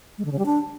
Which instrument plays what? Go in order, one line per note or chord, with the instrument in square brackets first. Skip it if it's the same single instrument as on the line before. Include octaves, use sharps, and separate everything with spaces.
[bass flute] G#3
D3
C#3
G3
D4